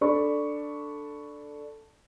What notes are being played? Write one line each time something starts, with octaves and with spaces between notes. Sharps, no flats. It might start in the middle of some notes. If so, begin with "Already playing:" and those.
D4 A4 D5 B5 C#6